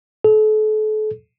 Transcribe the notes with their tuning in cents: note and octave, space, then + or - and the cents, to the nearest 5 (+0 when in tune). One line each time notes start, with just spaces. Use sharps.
A4 -35